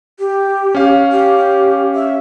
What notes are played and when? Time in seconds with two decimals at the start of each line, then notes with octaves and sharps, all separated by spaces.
0.19 G4
0.75 C#4 F5
1.12 G4
1.95 E5